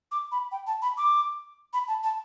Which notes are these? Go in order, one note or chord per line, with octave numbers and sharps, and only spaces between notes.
D6
B5
G5
A5
B5
D6
B5
A5
A5